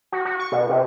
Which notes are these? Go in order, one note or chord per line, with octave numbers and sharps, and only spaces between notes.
F#4
F#4
C#6
B2
C3